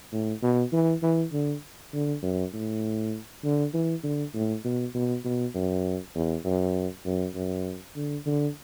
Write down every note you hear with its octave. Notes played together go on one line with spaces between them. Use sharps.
A2
B2
E3
E3
D3
D3
F#2
A2
D3
E3
D3
A2
B2
B2
B2
F#2
E2
F#2
F#2
F#2
D3
D3